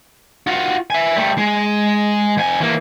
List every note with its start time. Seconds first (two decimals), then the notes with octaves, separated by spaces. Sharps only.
0.47 F4 F#4
0.90 E5 G#5
1.16 G3 A3
1.38 G#3
2.37 F2 G#5
2.61 E3 A#3